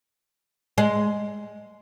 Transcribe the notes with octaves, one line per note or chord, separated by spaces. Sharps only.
G#3